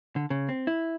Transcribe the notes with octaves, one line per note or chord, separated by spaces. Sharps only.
D3
C#3
C4
E4